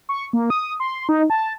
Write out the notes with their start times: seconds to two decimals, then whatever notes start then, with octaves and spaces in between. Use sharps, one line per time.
0.09 C#6
0.33 A#3
0.50 D#6
0.80 C6
1.09 D#4
1.30 A5